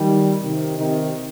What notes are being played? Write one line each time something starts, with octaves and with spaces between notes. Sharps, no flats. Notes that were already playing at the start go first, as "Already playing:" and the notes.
Already playing: D#3 G3
C3 D#3
C3 D#3